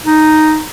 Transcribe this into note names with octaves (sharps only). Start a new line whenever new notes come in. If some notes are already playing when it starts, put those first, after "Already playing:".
D#4